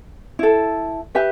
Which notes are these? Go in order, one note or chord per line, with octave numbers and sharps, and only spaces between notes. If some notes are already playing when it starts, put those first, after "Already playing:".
E4 A4
G4 B4 E5